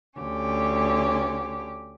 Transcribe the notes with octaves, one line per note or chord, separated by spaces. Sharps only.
D2 C#4 G4